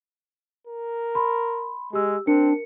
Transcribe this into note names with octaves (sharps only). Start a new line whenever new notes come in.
A#4
B5 C6
G#3 G4 E6
C4 D4 A#4 C#7